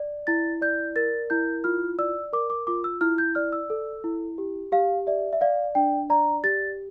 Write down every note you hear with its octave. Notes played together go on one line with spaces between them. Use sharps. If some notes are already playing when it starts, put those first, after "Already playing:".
Already playing: D5
E4 A6
D5 G6
A#4 A6
E4 G6
F4 F6
D5 E6
A#4 D6
D6
F4 D6
E6
E4 F6
G6
D5 F6
E6
A4
E4
G4
G4 F5
D5 E5
E5
D5 F5
D4 G5
D5 A#5
G4 A6